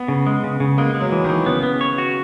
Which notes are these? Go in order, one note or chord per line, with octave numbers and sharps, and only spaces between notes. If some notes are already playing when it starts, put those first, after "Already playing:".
Already playing: B3
C#3
G#3
C#3
C#3
G#3 A#3
G#3
F#3
E3
D#3 E3
C#3 B3
B3
C#5
F#4